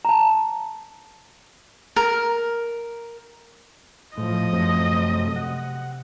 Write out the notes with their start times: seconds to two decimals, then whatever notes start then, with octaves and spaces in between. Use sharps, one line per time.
0.05 A5 A#5
1.96 A#4
4.18 A2 F3 D#5
4.53 F#2 A3 C4
4.90 C3
5.36 F#5